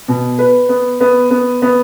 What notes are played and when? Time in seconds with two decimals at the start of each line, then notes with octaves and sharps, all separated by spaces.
0.08 B2
0.39 B4
0.69 B3
1.00 B3
1.30 B3
1.62 B3